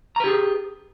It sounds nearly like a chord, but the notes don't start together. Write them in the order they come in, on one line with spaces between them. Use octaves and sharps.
A#5 B4 G4 G#4